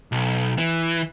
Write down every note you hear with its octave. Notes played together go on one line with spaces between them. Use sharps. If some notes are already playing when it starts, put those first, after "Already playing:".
B1
E3